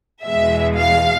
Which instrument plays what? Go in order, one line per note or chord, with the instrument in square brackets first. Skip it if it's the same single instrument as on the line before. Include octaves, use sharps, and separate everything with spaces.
[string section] E2 B2 G#3 E5
F5